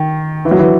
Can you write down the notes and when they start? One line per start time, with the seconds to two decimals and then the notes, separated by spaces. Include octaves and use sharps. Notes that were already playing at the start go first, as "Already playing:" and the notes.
Already playing: D#3
0.45 E3
0.51 F#3
0.59 E3